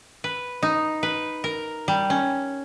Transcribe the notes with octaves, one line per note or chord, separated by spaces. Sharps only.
B4
D#4
B4
A#4
G3
C#4